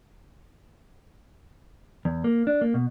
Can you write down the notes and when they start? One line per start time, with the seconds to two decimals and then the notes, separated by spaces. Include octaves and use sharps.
2.05 E2
2.24 A#3
2.47 D4
2.61 A#3
2.74 B2